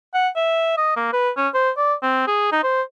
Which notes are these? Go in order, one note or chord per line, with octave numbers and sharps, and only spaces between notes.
F#5
E5
D#5
A#3
B4
C#4
C5
D5
C4
G#4
D#4
C5